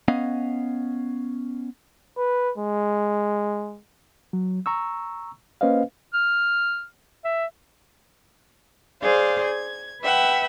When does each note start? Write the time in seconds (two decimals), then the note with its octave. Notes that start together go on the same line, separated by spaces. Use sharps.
0.08 B3 C#4 D#5 F5
2.17 B4
2.58 G#3
4.33 F#3
4.66 A#5 C#6 E6
5.61 A#3 C#4 B4 C5 D#5 F5
6.14 F6
7.25 E5
9.02 G#4 C5 D5 F5
9.45 G#6
10.03 B4 E5 F#5 G5